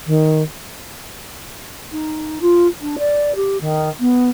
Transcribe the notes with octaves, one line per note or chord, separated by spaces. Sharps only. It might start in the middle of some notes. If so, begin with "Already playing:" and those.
D#3
D#4
F4
D4
D5
G4
D#3
B3